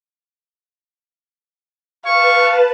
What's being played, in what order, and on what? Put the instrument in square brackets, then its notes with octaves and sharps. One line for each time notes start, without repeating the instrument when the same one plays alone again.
[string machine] B4 A5 [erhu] F5 [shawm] C#6